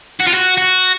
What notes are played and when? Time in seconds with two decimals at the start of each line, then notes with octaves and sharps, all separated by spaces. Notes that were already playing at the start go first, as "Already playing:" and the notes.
0.20 F#4
0.28 F4
0.35 F#4
0.58 F#4